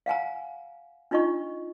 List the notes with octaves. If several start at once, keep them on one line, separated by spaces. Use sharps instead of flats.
F5 F#5 G#5 A#5
D4 D#4 F4 D#5 C#6